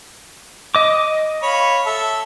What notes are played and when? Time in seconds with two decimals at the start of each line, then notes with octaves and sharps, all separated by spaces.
0.75 D#5 D6
1.43 C#5 F5 B5
1.86 A4 E5